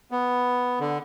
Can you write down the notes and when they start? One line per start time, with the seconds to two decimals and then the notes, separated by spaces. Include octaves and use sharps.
0.11 B3
0.80 D3